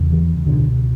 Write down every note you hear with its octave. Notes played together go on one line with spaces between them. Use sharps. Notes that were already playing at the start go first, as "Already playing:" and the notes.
Already playing: E2 C#3
E3
C#2 B2 D3